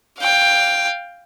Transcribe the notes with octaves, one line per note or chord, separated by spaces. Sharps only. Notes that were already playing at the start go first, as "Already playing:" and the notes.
F5 G5